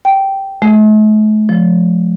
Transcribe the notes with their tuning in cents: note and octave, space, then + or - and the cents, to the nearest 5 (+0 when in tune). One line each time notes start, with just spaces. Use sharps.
G5 -10
A3 -45
F3 +10